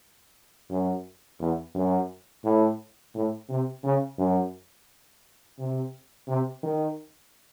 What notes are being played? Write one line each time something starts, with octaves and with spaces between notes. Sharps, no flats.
F#2
E2
F#2
A2
A2
C3
C#3
F#2
C3
C3
D#3